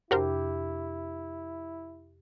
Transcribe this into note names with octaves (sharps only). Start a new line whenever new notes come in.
F2 C3 D4 E4 F#4 G4 A#4 C5